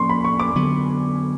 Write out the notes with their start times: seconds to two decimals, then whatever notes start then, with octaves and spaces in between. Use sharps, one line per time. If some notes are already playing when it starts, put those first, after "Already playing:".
Already playing: A2 F3 A#3 C#4 C6 C#6
0.10 B5
0.24 C#6
0.40 D6
0.55 D3 F#3 B3